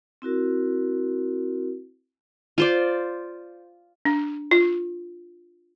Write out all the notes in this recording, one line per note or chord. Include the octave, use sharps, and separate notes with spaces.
C4 E4 F#4 A#4
F4 C5 D5
D4
F4